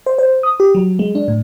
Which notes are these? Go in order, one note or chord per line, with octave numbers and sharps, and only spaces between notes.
C5
C5
D#6
G4
F#3
G#3
D4
A2